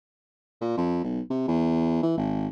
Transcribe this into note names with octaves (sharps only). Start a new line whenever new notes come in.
A#2
F2
B1
C3
E2
E3
G#1